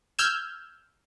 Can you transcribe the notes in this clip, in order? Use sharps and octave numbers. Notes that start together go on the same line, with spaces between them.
E6 F6 G6 G#6 E7